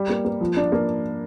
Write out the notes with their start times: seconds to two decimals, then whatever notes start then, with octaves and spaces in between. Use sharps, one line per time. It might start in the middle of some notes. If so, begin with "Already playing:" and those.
Already playing: G3
0.09 A#3
0.25 A#3
0.41 F3
0.57 D4
0.72 A#3